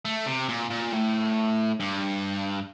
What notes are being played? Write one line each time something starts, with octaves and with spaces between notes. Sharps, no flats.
A3
C3
A#2
A#2
A2
G2